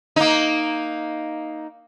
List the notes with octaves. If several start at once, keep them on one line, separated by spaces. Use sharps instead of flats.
A#3 D#4